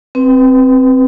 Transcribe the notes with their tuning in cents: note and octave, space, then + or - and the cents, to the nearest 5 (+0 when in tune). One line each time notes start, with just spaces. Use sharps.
C4 +0 B4 +0